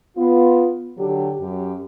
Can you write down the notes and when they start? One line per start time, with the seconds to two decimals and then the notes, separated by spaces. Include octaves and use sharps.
0.17 B3 F4
0.98 D3 F#3 D4 G4
1.41 F#2 G4